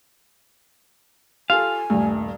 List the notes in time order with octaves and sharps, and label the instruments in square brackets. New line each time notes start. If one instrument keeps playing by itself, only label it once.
[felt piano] F4 G4 A4 [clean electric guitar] F5 [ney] G#5
[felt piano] D#1 G2 [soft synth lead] A3